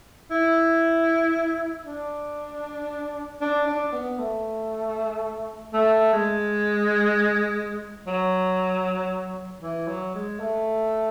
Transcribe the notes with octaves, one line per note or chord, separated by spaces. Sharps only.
E4
D4
D4
D4
B3
A3
A3
G#3
F#3
E3
F#3
G#3
A3